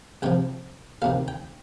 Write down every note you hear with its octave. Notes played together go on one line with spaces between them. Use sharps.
C2 C3 F3 G5
D2 C3 D#3 F5
G5